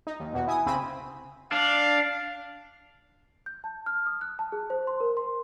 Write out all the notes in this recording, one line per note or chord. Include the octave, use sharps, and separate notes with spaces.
D#4
D#2
E2 B2 F#4
E4 G#5 D#6
C2 C#3 C4 B5 D#7
D4 F5
G6
A5
F6
D#6
F#6
A5
G#4
C5
C6
A#4
C6